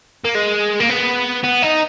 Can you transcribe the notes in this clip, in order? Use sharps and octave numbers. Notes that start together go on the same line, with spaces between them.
A#3
G#3
A#3
B3
B3
D#4